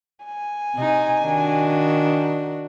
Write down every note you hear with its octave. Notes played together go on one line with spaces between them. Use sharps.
G#5
C3 D#4
D#3 D4 F#4